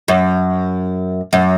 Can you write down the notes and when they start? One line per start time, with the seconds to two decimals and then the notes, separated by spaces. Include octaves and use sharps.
0.08 F#2
1.33 F#2